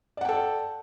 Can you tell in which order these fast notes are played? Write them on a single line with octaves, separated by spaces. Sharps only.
D5 F#5 G5 A4